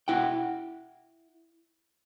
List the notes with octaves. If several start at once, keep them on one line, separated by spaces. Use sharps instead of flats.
E4 F#5 G5